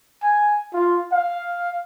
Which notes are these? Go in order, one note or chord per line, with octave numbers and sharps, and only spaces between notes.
G#5
F4
F5